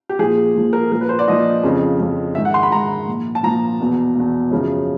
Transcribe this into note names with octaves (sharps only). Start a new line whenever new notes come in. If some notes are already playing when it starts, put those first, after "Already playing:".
G4
A#2 F3 G#4
A#2 F3
A#4
A#2 F3 A#4
B4
C5
D5
A#2 F3 D#5
F2 C#3 F3
F2 C#3 F3
G#2 D#3 E5
F#5
C6
B5
G#2 D#3 A#5
A#2 F3
A5
A#2 F3 A#5
E2 B2
E2 B2
F#2 C#3 F3